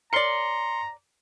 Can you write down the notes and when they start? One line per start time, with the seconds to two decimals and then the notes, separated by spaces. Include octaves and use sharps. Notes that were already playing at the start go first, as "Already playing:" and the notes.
0.13 A#4 C#5 D5 A#5 C6 C#7